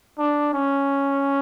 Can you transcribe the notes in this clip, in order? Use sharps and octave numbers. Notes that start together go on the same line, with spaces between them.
D4
C#4